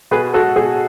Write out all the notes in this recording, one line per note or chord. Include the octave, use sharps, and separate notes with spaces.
B2 G#4 B4
G#3 F#4 A4
B2 G#4